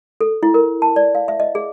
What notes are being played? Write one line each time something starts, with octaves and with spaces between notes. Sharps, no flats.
A4
E4
A#4
A5
D5
F5
E5
D#5
G#4